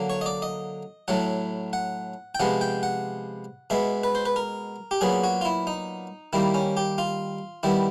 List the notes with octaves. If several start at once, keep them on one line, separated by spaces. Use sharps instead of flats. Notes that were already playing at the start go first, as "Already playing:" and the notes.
Already playing: D3 F#3 A#3
C#5
D#5
D5
D#5
A2 F#3 A3 F#5
F#5
G5
C3 F3 G#3 B3 F#5
G5
F#5
B2 G#3 B3 E5
B4
C5
B4
A#4
G4
A#2 F#3 B3 G#4
F#4
F4
E4
D#4
D#3 G3 A#3 E4
C#4
G4
F4
D#3 G3 B3 E4